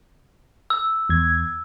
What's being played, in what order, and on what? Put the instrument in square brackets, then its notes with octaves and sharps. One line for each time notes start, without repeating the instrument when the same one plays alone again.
[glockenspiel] E6
[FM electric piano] E2 G#6